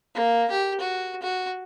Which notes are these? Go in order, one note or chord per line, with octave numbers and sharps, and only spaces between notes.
A#3
G4
F#4
F#4